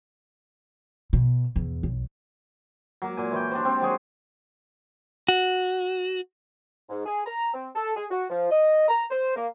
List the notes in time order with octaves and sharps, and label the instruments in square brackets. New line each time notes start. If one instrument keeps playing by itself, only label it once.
[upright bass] B2
E2
B1
[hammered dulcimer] F#3 A#3
A#2 G#5
E3 C#5 G5
D4 G4 C5
C4
F#3 G#3 G#4 C#5
[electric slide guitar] F#4
[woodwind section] G#2
G#4
A#5
C4
A4
G#4
F#4
F3
D#5
A#5
C5
A#3